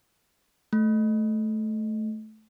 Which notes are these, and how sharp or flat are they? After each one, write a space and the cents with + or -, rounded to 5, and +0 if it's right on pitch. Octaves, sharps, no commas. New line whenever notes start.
A3 -15